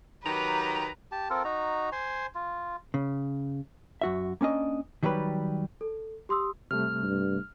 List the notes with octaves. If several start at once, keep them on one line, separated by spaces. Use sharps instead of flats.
D#3 F#3 G4 B4 A#5
G4 A5
C4 F4 A4 A#4
D#4 F#4 A#5
C5 G#5 C6
F4
C#3
F#2 F#4 E5
A#3 C#4 D4 D#5
D#3 F#3 G3 G4 B4
A4
G4 C6 D#6 E6
C3 G3 A3 F6
G2